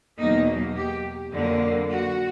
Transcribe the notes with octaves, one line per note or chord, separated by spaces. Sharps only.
E2 B2 F#3 A#3 D#4
G4
F2 D3 F#3 A#3
F#4